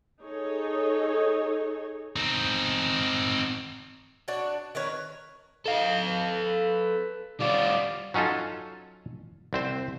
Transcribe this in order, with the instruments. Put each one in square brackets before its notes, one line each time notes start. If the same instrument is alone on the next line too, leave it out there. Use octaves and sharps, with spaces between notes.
[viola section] D#4 G#4 A4 C#5
[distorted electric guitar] C4 D#4
[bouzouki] D4 F#4 C#5
D#3 A#4 B4 C#5
[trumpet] D#4 [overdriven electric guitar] A4 F5
[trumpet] B4
[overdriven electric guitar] G3 F4 [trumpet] D5
[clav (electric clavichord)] F#3 C#4 D#4 F4 A4
C2 C4 C5